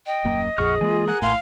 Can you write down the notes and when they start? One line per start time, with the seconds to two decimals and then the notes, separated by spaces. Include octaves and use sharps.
0.07 D#5 G5
0.24 D#1 F#2 A#3
0.58 A#1 F2 G#4 F#5 C#6 F6
0.81 E3 G#3 A#3 F4 G#5
1.08 A#4 F#5 G#5 F#6
1.22 A#1 A2 F5 C6